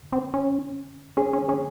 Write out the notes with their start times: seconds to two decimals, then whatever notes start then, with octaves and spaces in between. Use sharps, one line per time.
0.12 C4
0.34 C#4
1.17 C#4 G#4
1.33 C#4
1.48 C#4 G#4